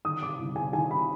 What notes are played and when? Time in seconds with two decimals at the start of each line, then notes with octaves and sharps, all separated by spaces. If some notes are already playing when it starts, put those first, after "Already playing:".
0.05 D#3 D#6
0.21 C3 D6
0.39 C2
0.56 C2 G#5
0.73 D#3 G#5
0.90 C3 B5